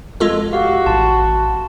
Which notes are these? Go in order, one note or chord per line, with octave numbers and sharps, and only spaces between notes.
F2 G#3 F4 A4
F#4 G4 F5
A1 A5 C6